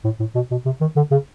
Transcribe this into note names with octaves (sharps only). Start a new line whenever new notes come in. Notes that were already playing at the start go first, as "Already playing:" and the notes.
A2
A2
B2
B2
C3
D#3
D3
C#3